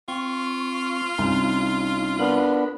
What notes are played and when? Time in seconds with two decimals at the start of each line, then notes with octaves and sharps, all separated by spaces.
0.08 C4 F4 C#6
1.18 C2 C#4 D#4
2.19 B3 D4 A#4 B5